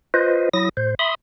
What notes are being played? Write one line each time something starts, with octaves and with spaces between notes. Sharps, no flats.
F4 B4 C5 D#5
F#3 E4 D#6 A#6
A2 C5
E5 B5 C6 D#6